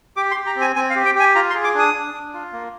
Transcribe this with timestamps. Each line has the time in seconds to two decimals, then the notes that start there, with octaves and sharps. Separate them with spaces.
0.17 G4 D6
0.31 C6
0.36 G4
0.46 A#5
0.56 C4
0.61 G#5
0.76 C4 G#5
0.90 F5
0.96 G4
1.05 G5
1.15 G4 G#5
1.35 F4 A#5
1.50 C6
1.54 G#4
1.64 D6
1.75 D4 D#6
1.94 D4
2.14 D4
2.34 F4
2.53 A#3